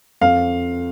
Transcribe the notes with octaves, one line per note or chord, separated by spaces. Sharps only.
F2 F5